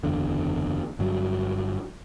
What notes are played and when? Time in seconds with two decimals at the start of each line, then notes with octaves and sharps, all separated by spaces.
0.04 F#1 E2 D3
0.99 G1 G2 F#3